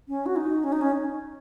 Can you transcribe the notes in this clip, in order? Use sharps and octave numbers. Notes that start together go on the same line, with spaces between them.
C#4
F#4
D#4
C#4
D#4
C#4